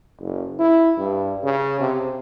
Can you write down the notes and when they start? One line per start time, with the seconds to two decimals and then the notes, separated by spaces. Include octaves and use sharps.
0.20 F#1
0.59 E4
0.97 G2
1.43 C#3
1.80 C3